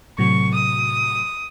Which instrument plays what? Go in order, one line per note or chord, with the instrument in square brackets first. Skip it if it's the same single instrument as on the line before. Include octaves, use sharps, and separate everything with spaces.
[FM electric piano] A2 C3 F#3 [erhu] C#6
[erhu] D#6